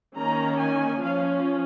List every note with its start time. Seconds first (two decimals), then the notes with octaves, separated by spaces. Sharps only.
0.17 D#3 A#3 C#4 A#5
0.59 G#5
1.02 F3 C#4 F5